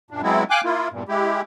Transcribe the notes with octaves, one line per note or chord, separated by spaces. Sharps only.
F#2 A#2 D4
F#3 G#3 B3 C4 E4
F5 G5 G#5 D6 F#6
A#3 E4 F4
E2 G2 A#2
G#3 E4 G4